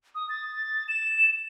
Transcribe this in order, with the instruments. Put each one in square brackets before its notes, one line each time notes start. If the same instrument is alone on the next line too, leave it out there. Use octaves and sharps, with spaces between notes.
[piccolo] D#6
A6
E7